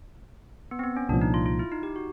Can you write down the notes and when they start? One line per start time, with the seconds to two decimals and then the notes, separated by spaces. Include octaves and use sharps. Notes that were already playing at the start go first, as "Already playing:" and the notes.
0.71 B3
0.79 C4
0.83 B3
0.96 C#4
1.09 C2 A#2 F3 D4
1.21 D#4
1.34 F4
1.46 F4
1.59 E4
1.71 D#4
1.83 G4
1.96 F#4